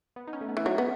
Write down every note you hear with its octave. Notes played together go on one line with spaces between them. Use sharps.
B3
D#4
C#4
A3
B3
E3
F#3 D#4
B3